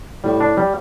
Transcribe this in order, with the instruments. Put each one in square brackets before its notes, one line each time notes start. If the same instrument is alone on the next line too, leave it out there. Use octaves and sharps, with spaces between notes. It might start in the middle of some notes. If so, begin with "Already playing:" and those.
[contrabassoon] A2 [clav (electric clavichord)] G3
[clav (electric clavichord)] D4
G3